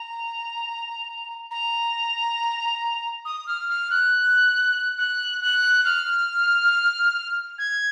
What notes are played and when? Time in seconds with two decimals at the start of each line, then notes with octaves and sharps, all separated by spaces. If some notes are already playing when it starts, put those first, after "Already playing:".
Already playing: A#5
1.51 A#5
3.25 D#6
3.47 F6
3.69 F6
3.90 F#6
4.98 F#6
5.42 F#6
5.85 F6
7.58 G#6